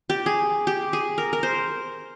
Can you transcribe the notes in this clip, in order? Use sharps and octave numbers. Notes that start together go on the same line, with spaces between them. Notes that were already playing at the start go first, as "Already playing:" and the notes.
G4
G#4
G4
G#4
A#4
A#4
C5